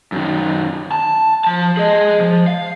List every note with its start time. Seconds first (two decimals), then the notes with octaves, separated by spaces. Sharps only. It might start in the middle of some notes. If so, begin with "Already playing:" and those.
0.12 F#2 D#3
0.92 A5
1.45 F3 A5
1.77 G#4 D#5
2.20 F3
2.48 F5